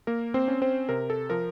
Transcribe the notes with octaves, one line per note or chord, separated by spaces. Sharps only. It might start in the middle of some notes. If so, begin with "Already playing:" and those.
A#3 A#4
C4 C5
C#4
C4 C5
C3 A#4
A4
F3 A#4